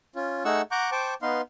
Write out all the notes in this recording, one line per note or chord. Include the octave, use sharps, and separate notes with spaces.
C#4 F4
A3 D#4 G#4 F#5 C#6 E6
F#5 A#5 C#6 D6 G6
C5 G5 A5 C#6 D6
B3 D#4 B4 F5 C6